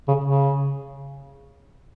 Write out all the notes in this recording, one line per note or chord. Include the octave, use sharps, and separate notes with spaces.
C#3
C#3